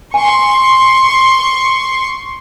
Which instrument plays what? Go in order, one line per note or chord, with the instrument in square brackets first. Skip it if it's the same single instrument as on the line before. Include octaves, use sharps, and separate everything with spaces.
[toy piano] G#5 [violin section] C6 C#6